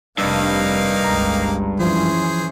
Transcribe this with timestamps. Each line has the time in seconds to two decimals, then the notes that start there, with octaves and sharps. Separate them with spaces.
0.18 F1 C2 G2 C3 A#3 D#4 F5 E6
1.04 G1 C#2 A#5
1.80 F#2 E3 F3 C#4 G#4 C5